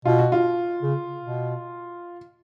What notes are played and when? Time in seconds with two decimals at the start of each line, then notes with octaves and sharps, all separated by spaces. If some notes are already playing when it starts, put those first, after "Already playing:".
0.05 B2 F4
0.19 F#4
0.32 F4
0.82 C#3
1.21 B2